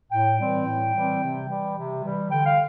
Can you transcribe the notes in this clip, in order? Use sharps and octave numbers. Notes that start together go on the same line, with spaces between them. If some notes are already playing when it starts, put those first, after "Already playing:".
A2 G5
E3 G3 C4
A2
E3 G3 C4
C3
E3 G3
C3
E3 G3
D3 G5
F5